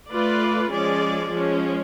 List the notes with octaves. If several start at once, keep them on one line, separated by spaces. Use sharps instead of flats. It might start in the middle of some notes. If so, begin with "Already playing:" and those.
A3 F4 B4 D5
F3 G#3 C#4 G#4 D5
F3 G#3 C#4